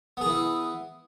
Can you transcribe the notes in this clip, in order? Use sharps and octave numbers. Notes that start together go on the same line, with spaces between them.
E3 B3 E4 G#4